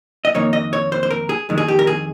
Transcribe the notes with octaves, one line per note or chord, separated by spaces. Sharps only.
D#5
F2 D#3 A#3 D#4 C#5
D#5
C#5
C5
C5
A#4
G#4
F2 D#3 G#3
G#4
G4
A#4
G#4